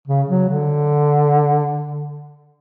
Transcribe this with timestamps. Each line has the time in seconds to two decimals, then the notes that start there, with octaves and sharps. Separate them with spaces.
0.07 C#3
0.29 F#3
0.49 D3